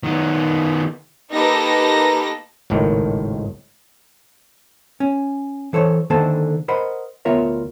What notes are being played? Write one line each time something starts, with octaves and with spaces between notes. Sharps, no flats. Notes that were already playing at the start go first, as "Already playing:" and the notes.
D#3 B3
A#3 D#4 G4 A4 B4 A#6
G#1 C#2 A2 D#3
C#4
E3 A4 C5 C#5
D3 D#3 A#3 A4 C5 A5
A#4 C5 D#5 F#5 B5
D2 B3 F4 A#4 C#5 E5